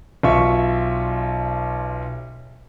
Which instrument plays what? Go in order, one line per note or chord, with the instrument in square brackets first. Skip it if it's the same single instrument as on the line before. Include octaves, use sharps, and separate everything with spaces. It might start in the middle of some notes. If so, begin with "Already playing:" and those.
[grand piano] B1 F4 E5 C#6